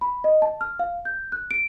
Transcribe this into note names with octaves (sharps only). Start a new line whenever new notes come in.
B5
D#5
A5
F6
F5
G6
F#6
D7